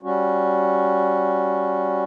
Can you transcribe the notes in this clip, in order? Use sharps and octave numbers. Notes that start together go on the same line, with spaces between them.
G3 C#4 F#4